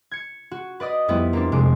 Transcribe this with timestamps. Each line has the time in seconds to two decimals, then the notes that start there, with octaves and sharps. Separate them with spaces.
0.11 G#6 C#7
0.51 F#4
0.80 B4 D5 D#5 D#6
1.08 F2 G3 B3 E4
1.33 A#3 C4 D4
1.52 F2 C3 G#3 D6